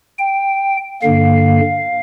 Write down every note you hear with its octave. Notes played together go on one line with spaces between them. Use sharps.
G5
G2 D3 A#3 F5